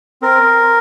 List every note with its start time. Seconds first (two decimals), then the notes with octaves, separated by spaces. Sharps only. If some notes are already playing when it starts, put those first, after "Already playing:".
0.22 C4 A#4